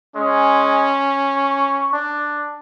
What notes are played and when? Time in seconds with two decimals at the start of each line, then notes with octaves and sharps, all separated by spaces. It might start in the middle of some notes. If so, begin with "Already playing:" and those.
0.16 G#3 C#4
1.36 C#6
1.93 D4